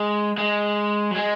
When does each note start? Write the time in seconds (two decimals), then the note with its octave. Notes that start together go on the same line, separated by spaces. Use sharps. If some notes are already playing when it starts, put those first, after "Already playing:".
Already playing: G#3
0.38 G#3
1.11 F#3
1.16 G#3